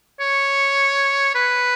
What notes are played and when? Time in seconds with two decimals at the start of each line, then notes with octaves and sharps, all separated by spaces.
0.20 C#5
1.35 B4